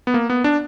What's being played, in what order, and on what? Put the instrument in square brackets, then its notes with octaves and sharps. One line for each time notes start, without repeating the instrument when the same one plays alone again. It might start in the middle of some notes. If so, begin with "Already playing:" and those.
[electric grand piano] B3
A#3
B3
D4